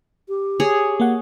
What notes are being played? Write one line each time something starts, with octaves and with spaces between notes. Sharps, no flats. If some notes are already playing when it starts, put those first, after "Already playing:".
G4
G#4 C#5
A#3 F#5